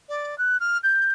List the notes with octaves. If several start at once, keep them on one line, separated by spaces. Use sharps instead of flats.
D5
F#6
F6
G6